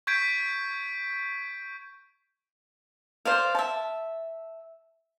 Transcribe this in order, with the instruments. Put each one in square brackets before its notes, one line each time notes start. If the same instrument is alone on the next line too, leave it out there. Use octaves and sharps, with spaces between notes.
[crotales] C#6 G6 G#6 B6 D7
[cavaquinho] C5 D5 F5
E5 A5